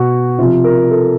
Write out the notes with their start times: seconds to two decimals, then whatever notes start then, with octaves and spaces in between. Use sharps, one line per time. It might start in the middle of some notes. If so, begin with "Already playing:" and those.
Already playing: B2 F#4
0.39 C3 F3 F4
0.65 A#4
0.91 A4